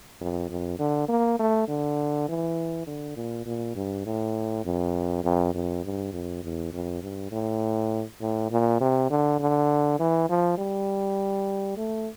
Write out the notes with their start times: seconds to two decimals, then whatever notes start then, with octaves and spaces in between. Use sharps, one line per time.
0.21 F2
0.50 F2
0.79 D3
1.09 A#3
1.39 A3
1.68 D3
2.28 E3
2.87 D3
3.16 A#2
3.46 A#2
3.76 G2
4.06 A2
4.65 F2
5.24 F2
5.54 F2
5.84 G2
6.13 F2
6.43 E2
6.73 F2
7.02 G2
7.31 A2
8.21 A2
8.51 A#2
8.81 C3
9.10 D3
9.40 D3
10.00 E3
10.29 F3
10.58 G3
11.77 A3